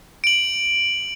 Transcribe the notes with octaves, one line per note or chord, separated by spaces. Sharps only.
D7 F#7